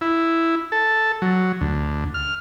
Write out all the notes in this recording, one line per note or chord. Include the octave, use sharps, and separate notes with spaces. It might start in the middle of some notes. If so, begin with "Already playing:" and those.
E4
A4
F#3
D2
F6